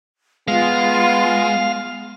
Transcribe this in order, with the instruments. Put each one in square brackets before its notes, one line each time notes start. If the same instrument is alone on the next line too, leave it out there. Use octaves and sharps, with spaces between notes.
[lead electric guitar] G#3 [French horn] B3 [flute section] F4 [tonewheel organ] F5